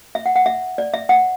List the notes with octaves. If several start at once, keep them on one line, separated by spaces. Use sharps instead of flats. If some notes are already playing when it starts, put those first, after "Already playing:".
E5
F#5
F#5
E5
D5
E5
F#5